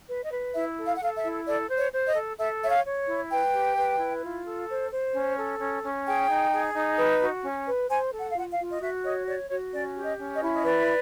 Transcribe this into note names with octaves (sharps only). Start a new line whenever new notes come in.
B4
D#5
B4
E4 E5
A4
F5
F#5
A4 F5
E5
E4
A4 D5
C5
C#5
C5
D#5
A4
A4 E5
C#5 E5
F5
C#5
E4
B4 G5
G4
B4
E4
F4
A4
C5
C5
C#4
A4
C#4
C#4
G#4 G5
D#4
G#4
D#4
B4
F#4
C#4
B4
C5 G#5
A4
F#5
F5
F4 F#5
F5
F4
D#5
F#4 E5
C#5 D#5
C#5 D5
F#4 C#5
C#4 D5
G4
D#5
C#4
D#5
E4
D#5
B4 D5